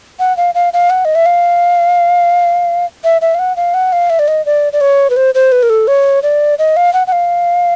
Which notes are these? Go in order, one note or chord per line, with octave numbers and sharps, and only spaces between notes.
F#5
F5
F5
F5
F#5
D#5
E5
F5
E5
E5
F5
F#5
F5
F#5
F5
E5
D5
D#5
D5
D5
C#5
B4
C5
C5
B4
A#4
A4
C#5
D5
D#5
F5
F#5
F#5
F5